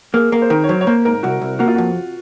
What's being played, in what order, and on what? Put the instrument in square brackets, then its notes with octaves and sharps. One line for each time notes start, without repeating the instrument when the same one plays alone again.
[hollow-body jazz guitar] A#3 [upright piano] G#4
[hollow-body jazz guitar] A#3
[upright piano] C5
[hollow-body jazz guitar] D#3 [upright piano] A#4
[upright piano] C#5
[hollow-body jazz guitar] F#3 [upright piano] C5
[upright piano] C#5
[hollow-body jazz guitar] A#3 [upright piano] C5
[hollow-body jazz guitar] G#2 [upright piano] A#4
[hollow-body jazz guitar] C2 [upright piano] F#4
[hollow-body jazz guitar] C2
[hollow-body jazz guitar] A#3 [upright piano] F#4
[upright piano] F4
[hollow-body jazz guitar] F2 [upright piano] F#4